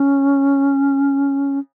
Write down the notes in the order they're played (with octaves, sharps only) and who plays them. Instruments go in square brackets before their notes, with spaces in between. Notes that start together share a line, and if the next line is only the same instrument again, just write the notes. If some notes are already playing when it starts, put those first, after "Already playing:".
Already playing: [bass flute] C#4